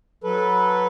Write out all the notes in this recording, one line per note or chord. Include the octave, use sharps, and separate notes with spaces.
F#3 A4 B4